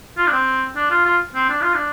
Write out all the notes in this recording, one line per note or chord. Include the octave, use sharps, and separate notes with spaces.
F4
D4
C4
D4
F4
F4
C4
D4
F4
D4